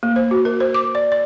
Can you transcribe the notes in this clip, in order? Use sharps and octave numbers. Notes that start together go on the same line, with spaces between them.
A#3
C5
F#4
A#4
C5
D6
D5
D5